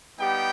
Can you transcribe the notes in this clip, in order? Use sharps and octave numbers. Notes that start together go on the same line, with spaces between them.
G3 B3 D#4 G4 G5